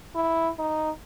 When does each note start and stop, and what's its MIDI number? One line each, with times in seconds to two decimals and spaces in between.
0.16 0.49 64
0.59 0.90 63